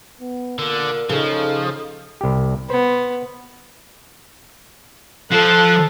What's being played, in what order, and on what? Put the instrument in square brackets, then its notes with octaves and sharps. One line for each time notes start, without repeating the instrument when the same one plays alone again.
[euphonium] B3
[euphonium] A#2 [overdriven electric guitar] D3 [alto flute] A#4
[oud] C#3 [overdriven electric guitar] F3 [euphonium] D#4 [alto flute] A4
[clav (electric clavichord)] C2 G4
[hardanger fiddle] B3 [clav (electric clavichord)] C5
[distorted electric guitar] F3 C5 [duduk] A4 [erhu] F#6